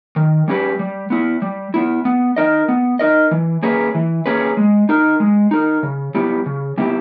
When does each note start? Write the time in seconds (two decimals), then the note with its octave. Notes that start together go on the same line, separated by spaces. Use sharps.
0.16 D#3
0.48 G3 C#4 G4 B4
0.79 G3
1.10 B3 E4
1.42 G3
1.74 B3 E4
2.05 B3
2.36 D#4 A#4 D#5
2.68 B3
2.99 D#4 A#4 D#5
3.31 E3
3.63 A#3 C#4 G#4 B4
3.94 E3
4.26 A#3 C#4 G#4 B4
4.57 G#3
4.89 D#4 A#4
5.20 G#3
5.51 D#4 A#4
5.83 C#3
6.15 G3 B3 E4 G4
6.46 C#3
6.78 G3 B3 E4 G4